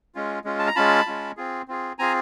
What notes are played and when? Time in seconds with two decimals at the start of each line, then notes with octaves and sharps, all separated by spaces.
0.15 G#3 C#4 F4
0.44 G#3 C#4 F4
0.59 A5
0.67 A#5
0.76 G#3 C#4 F4 A5 B5
1.06 G#3 C#4 F4
1.37 C4 F4 G#4
1.68 C4 F4 G#4
1.99 C4 F4 G#4 G#5 A#5